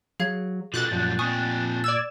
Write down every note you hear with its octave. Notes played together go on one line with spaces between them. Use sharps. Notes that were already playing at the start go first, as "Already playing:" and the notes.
F#3 G#4 F5 G#6
B2 F4 F#4 A4 F#6 G6 A6
F#2 A#2 F3 F#3
C4 F4 G#5 C#6 D#6
D5 E6 G#6 E7